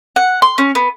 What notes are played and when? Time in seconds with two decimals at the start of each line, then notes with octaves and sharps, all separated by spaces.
0.16 F#5
0.42 C6
0.58 C#4
0.75 B3